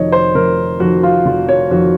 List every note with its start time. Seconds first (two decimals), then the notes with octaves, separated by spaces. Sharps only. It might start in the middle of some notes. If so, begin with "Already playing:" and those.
Already playing: F1 F2 D#3 C#5 D#5
0.12 C5
0.35 F1 A#4
0.80 F2 D#3 F#4
1.03 F4
1.26 F1 F4
1.49 C#5
1.71 F2 D#3 F#4